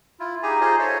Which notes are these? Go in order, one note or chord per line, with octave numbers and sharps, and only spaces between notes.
E4 F4
D#4 G4 G#4 G#5 A#5
D#4 F4 G#4 C5 D#5
A4 C5 C#5 D#5 E5